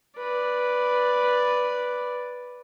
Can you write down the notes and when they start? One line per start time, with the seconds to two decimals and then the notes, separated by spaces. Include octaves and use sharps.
0.18 B4 D5